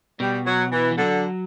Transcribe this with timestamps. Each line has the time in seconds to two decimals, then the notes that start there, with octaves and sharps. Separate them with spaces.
0.20 B2 G3
0.46 F#3
0.72 E3
0.91 E3
0.97 D3 F#3